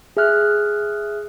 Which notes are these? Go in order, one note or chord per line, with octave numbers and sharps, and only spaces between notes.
G#4 E5 F6 F#6